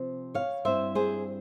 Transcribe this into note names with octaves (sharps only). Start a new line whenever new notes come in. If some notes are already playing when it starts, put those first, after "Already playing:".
Already playing: C3 F3 C4
C#5 F5
G2 G3 C4 E4 C5 E5
G#4 C5